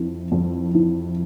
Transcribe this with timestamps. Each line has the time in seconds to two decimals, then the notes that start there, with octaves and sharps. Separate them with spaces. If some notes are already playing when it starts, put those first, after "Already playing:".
Already playing: F2 E3
0.32 F2
0.75 E3